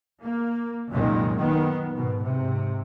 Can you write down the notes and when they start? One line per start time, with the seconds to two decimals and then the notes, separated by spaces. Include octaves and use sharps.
0.23 A#3
0.91 C2 F#2 A#2 D#3 G#3
1.37 D#3 B3
1.93 G#2 B2
2.24 G#2 C3